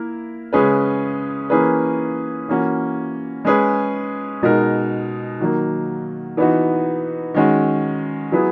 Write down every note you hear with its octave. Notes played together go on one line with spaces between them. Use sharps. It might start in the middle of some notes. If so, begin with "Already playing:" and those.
Already playing: A#3 E4 A#4
C#3 G#3 C#4 G#4 B4
E3 A#3 C#4 G#4 B4
E3 A#3 C#4 F#4
G#3 C#4 G#4 B4
B2 G#3 D#4 A#4
D#3 F#3 A#3
E3 B3 D#4 F#4
D#3 G#3 C#4 F#4
F#3 B3 E4 G#4